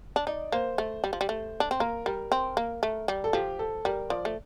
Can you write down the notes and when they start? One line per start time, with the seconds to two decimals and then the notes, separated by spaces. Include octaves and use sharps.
0.16 D4
0.27 D#4 D5
0.52 A#3 C5
0.78 A3
1.04 G3
1.13 F3
1.21 G3
1.29 A3
1.60 D4
1.71 C4
1.80 A#3 A#4
2.06 G3 A#4
2.32 C4
2.57 A#3
2.83 A3
3.08 G3
3.24 A4
3.33 F3 G4
3.59 A4
3.85 G3 A#4
4.10 F3 D5
4.25 A3